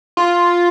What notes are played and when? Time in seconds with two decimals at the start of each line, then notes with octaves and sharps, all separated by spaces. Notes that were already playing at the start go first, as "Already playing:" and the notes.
0.17 F4